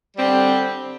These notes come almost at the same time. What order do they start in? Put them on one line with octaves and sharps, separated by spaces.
G3 C4 D3